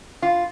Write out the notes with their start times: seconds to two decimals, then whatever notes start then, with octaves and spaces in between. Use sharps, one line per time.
0.22 F4